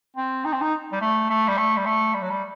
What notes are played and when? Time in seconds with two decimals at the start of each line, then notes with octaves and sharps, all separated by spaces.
0.16 C4
0.45 D#4
0.53 C4
0.61 D#4
0.93 G3
1.01 A3
1.30 A3
1.48 G3
1.57 A3
1.77 G3
1.86 A3
2.14 G3
2.22 F#3
2.30 G3